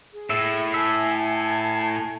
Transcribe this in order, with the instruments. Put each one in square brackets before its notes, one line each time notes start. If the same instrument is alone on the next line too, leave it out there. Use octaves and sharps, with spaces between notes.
[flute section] G#4
[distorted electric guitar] A2 [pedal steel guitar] E5
[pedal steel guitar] E5 [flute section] G#5 A5 G#6